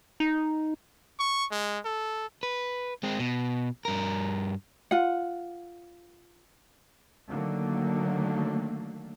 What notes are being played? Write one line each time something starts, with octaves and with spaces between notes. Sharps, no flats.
D#4
C#6
G#3
A4
B4
G#3 C4
B2
G2 A#4
F4 F#5
D3 D#3 F#3 A3 A#3